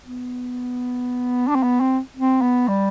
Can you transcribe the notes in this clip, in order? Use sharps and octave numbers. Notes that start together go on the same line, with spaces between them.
B3
D4
C4
B3
C4
C4
B3
G3